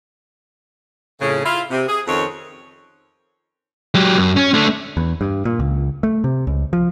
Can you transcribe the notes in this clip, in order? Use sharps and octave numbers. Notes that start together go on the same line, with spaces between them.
F2 A2 C#3
E4 F4
C3
G#4
F2 D#3 C4 C#4 C#5
F#3 G4
F#2
C#4
A3 D4
E2
G2
A#2
C#2
A3
C3
C#2
F3